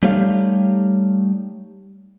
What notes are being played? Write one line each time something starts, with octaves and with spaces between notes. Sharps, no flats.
G3 A3 D#4 G4 C#5 F5